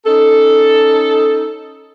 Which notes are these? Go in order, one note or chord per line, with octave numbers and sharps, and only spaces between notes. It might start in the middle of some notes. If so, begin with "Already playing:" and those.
C#4 D#4 A4